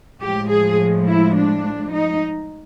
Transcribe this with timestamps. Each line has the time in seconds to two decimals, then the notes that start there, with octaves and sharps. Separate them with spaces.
0.21 A2 F3 G#3 G4
0.50 G#4
1.07 E4
1.35 D4
1.91 D#4